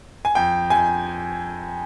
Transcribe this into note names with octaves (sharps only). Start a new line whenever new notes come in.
G#5
F2 G5
F2 G#5